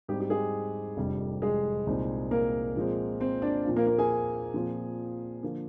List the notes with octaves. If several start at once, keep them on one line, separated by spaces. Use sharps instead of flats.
G#2 G3 C4 G4
G4
G#3 G#4
F1 F2 C3 G3 D4
G#3 G#4
C2 A#2 G#3 C4 D#4
A#3 A#4
A#2 F3 G#3 C4
C4 C5
D4 D5
A#2 F3 C4 F4
A#3 A#4
A#3 A#4
G#4 G#5
A#2 F3 C4 F4
D3 F3 A#3